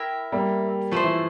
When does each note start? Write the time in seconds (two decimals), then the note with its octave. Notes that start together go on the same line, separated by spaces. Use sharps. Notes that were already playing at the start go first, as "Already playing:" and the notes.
Already playing: E4 A#4 E5 G5
0.32 G3 A#3
0.92 F3 A3 E4 A4 C5
1.04 E3